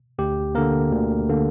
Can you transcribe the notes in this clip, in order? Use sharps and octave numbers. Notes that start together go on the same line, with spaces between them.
D2 G4
D3 A#3 A#4
D2
D3 A#3